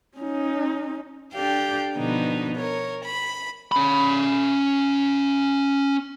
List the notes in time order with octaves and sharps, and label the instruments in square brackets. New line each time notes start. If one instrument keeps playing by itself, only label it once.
[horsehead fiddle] C#4 D#4
[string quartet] D4 G4 A4 F5 G5
B2 D3 F3 B3 D4 D#4
A#4 C#5
B5
[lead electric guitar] C#4 B5